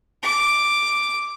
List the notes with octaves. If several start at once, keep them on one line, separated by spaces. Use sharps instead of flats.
D6